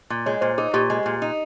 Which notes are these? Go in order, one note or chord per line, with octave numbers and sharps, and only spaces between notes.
A#2
G#3 C#5
A#2 C5
D#4 G#4
A#2 G4
G#3
A#2
D#4